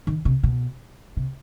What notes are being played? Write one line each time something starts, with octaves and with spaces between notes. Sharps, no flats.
D#3
C3
B2
C3